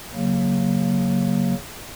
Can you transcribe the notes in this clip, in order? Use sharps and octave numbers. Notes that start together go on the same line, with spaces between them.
C#3 F#3 A#3